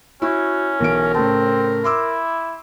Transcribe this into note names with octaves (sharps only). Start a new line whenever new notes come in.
C#4 E4 F#4
B1 E3 A#4 D7
A2 C#3 C4 A5
E4 C6 D6 E6